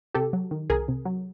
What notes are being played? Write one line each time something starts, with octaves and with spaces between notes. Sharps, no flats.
C3 G4 A4
F#3
D#3
C2 G#4 A#4
C3
F#3